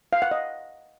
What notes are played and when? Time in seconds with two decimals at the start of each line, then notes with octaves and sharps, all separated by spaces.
0.13 F5
0.22 F#5
0.31 D#5